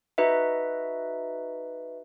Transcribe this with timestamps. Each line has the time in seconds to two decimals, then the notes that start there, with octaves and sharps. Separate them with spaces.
0.18 D#4 F#4 B4 D#5 E5